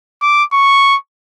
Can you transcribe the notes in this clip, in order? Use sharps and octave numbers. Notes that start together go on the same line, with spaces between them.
D6
C#6